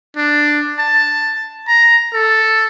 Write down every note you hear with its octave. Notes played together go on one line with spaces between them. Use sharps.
D4
A5
A#5
A4